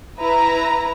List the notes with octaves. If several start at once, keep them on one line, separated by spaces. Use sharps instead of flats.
E4 B4 A#5